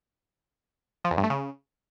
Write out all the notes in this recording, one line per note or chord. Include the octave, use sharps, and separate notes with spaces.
F3
E2
G2
A3
C#3